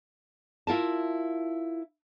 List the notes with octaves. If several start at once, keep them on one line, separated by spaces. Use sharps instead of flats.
E4 F4 A#4 A5